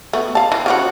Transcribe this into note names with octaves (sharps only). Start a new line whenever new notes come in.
A3 B3
F5 A5
E3
C#3 F3 F#4